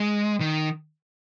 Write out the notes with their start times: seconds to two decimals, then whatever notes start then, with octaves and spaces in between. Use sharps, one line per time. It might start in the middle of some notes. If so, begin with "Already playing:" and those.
Already playing: G#3
0.40 D#3